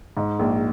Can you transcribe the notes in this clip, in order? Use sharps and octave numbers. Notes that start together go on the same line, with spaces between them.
G#2
A#1